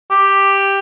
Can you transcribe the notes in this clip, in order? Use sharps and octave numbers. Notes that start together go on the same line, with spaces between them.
G4